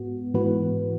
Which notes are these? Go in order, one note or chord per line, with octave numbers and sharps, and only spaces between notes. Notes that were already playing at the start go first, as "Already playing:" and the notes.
Already playing: G#2 B3 F#4
G#2 E3 B3 F#4 B4